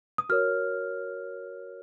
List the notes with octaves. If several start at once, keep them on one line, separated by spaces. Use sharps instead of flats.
D#6
F#4 A#4 C#5 F6